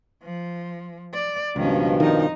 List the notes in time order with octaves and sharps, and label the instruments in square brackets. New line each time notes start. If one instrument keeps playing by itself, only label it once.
[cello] F3
D5
[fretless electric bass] C#2 [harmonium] G2 B2 F3 [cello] D#3 C#4
[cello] F2 D#4 [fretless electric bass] D#3 G3